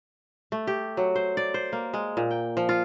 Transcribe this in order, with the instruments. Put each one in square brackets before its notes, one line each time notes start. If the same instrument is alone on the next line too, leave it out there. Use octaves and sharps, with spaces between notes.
[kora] A3
G4
F#3
C5
D5
C5
A#3
G#3
A#2
G5
F3
F4